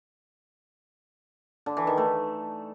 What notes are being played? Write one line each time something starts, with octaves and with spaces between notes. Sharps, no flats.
D3
E3
D#3
A3